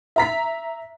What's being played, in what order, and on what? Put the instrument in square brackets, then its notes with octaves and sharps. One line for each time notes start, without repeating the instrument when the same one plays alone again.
[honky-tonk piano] E5 A#5 B6